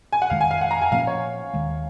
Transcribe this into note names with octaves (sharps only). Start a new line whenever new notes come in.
G#5
F#5
F2 D#3 G#3 F5
G#5
F5
F#5
A#5
G#5
A#2 F3 A#3 C#4 F5
C#5
D#2 D#3 G#3